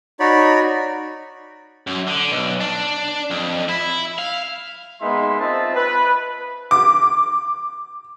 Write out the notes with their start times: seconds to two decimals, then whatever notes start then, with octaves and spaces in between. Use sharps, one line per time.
0.20 D#4 F#4 C#5 D5 B5
1.87 F#2
2.08 D3
2.30 B1
2.61 D4
3.31 F2
3.69 E4
4.18 F5
5.01 G#3 A#3 B3 D#4 E5 C6
5.40 C4 F4 C5 D#5 E5 A5
5.75 B4
6.71 D6